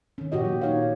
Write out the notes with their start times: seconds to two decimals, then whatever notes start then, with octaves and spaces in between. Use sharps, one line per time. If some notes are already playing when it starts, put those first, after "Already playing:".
0.18 D#3 C#4
0.32 A#2 F#4 G4 D#5
0.45 F#3
0.62 D#4 C#5 F5